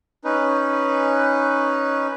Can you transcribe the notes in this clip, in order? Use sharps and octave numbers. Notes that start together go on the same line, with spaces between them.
C#4 D#4 B4